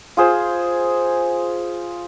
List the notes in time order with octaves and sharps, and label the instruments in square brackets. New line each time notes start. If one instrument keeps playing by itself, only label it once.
[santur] F4 G#4 C5